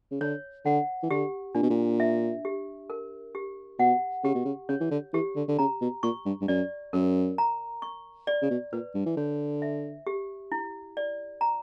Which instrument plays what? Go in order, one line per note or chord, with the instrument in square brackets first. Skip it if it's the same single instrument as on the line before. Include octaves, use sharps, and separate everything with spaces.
[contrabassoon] C#3
[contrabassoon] D3 [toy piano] C#5
[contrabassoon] D3 [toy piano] F#5
[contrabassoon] E3
[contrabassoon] D3 [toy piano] G4
[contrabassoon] A#2 [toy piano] D4
[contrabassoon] B2
A#2
[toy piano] E5
G4
A#4
G4
[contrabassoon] B2 [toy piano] F#5
[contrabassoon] C#3 [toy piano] G4
[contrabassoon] B2
C#3
[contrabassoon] C#3 [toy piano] C#5
[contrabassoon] E3
D3
[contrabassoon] E3 [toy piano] G4
[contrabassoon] D3
D3
[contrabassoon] C#3 [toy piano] A#5
[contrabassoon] B2
[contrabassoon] A#2 [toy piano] C#6
[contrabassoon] G2
G2
[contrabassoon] F#2 [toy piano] D5
[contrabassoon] F#2 [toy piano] A#4
[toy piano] A#5
C#6
D5
[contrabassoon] C#3
B2
[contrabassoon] A#2 [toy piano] B4
[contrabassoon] G2
E3
[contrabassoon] D3 [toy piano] C#5
[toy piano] E5
G4
E4
D5
A#5